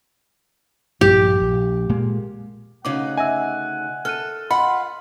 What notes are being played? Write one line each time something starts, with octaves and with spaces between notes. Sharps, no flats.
A#1 G2 G3 G4
A#1
A#2 G#3 A#3
D2 C#3 D#4 F#5 D6
D#5 E5 G#5 E6
A4 F6 F#6 D#7
F4 D#5 F#5 B5 C6